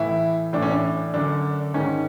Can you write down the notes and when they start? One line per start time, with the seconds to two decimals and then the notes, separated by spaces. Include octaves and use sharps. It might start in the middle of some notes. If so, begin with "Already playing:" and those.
Already playing: A2 E3 E4
0.53 A2 E3 D4
0.62 C#4
0.72 D4
1.14 F#2 D3 D4
1.74 G#2 D#3 C#4